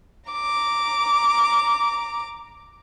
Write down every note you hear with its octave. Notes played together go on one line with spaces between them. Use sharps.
A#5 D6